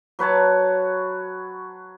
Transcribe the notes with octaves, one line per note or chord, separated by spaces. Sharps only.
F#3 B4 C#5 A5